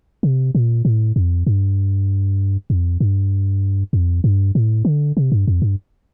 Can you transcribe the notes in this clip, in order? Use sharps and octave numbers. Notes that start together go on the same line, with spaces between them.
C3
A#2
A2
F2
G2
F2
G2
F2
G2
A2
D3
C3
G2
F2
G2